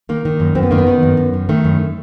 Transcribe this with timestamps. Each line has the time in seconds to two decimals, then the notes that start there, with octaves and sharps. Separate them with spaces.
0.09 D#3 A#3
0.25 D#3
0.40 F#2
0.55 F#2 C4
0.63 B3
0.71 D#3 A#3
0.78 B3
0.87 D#3
1.03 F#2
1.17 F#2
1.34 D#3
1.49 D#3 A3
1.64 F#2